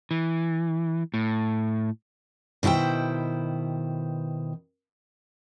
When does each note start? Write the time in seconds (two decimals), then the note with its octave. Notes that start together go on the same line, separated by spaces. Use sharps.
0.11 E3
1.14 A2
2.63 B2 D#3 E4 C5 G5